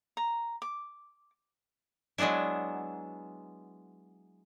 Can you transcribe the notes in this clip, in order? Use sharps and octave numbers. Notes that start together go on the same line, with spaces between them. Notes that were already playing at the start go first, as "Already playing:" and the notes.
A#5
D6
F#3 G#3 B3 D4 E4